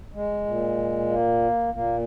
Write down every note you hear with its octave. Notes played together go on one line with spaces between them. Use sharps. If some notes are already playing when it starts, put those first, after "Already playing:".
G#3
A#2
A#3
A#2 A#3